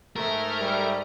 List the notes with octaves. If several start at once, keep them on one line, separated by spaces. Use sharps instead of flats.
G#2 A3 A#4
G3